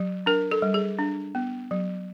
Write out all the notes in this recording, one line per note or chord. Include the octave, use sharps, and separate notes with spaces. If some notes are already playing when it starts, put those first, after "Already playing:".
Already playing: F#3
D4 A#4
A4
G3
G#4
D4
B3
F#3